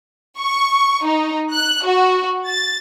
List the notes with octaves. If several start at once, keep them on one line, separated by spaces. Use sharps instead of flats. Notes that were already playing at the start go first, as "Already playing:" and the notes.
C#6
D#4
F#6
F#4
A6